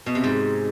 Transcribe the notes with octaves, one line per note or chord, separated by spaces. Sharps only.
B2
C3
G#2